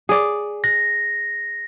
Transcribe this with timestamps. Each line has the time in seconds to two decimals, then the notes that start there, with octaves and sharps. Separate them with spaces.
0.09 G#4 D5
0.64 A#6